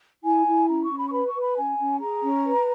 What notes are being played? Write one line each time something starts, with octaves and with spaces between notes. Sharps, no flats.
E4 G#5
E4
C#4 A#5
C#6
C#4
B5
C#6
B4 B5
C#6
B4
B5
C#4 G#5
C#4
G#4 A#5
C#4
B4